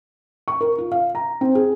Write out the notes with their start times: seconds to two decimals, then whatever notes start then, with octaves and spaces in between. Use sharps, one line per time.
0.48 C#6
0.61 A#4
0.78 F4
0.92 F5
1.15 A#5
1.41 C4
1.55 G#4